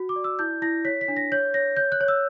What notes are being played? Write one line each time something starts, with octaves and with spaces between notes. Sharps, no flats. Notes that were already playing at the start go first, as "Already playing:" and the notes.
Already playing: F#4
D6
D5
E6
E4 G6
E4 A#6
C#5 B6
B6
D4
A#6
C#5 G6
C#5 A#6
C#5 G6
F#6
C#5
E6